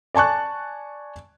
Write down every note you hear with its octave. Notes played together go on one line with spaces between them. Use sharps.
D5 G#5 A5 C#6 F#6